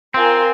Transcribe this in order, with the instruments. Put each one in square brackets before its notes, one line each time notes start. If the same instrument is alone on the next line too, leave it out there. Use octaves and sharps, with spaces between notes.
[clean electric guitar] C4 [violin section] F4 A#4 F5 G#5